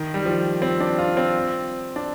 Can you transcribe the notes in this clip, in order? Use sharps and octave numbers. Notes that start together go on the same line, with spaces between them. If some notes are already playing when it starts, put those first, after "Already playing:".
Already playing: D#3
G3
F3
C4
D4
F4
C4
D4